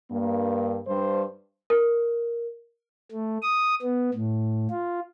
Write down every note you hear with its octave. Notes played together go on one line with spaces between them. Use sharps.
G2 A#3
G2 C5
A#4
A3
D#6
B3
A2
F4